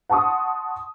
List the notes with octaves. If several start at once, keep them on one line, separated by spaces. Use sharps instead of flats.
F#5 A5 C6 C#6 D#6